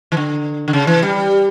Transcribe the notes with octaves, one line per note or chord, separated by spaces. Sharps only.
E3
D3
D3
C#3
E3
G3